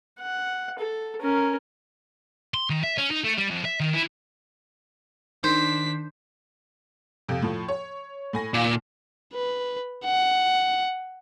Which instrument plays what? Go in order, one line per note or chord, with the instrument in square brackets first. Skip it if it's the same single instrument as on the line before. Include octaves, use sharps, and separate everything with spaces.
[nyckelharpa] F#5
A4
C#4 A#4
[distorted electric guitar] C6
D#3
E5
C#4
D#4
A3
G3
F2
E5
D#3
E4
[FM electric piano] D#3 [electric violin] D4 B6 [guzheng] C5
[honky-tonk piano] F2 C3
A2 F3
C#5
A2 G#5 A#6
[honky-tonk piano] D#2 F5 [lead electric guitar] A#2
[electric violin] B4
F#5